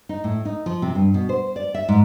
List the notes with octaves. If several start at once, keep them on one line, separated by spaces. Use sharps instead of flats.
D#4
A2
D#4
F3
C3
G2
B2
C5
D5
E5
G#2